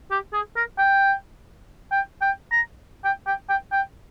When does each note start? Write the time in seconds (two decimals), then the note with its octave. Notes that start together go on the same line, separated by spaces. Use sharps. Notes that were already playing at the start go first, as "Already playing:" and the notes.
0.11 G4
0.33 G#4
0.56 A#4
0.78 G5
1.91 G5
2.21 G5
2.51 A#5
3.05 G5
3.27 G5
3.49 G5
3.72 G5